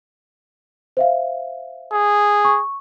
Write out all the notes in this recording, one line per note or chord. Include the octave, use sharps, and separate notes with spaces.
C5 E5 F5
G#4
C#6